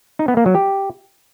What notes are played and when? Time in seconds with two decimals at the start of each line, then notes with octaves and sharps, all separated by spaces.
0.19 D#4
0.28 B3
0.37 A#3
0.46 F#3
0.55 G4